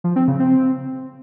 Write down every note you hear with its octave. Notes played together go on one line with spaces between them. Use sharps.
F3
C4
C#3
C4